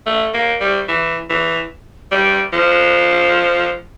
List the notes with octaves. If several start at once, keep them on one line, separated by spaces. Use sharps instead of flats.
A3
A#3
G3
E3
E3
G3
F3